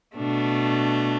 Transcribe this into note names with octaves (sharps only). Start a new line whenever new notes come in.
B2 A3 D4